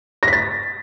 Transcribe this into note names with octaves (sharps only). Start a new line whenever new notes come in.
A#6
B6
A6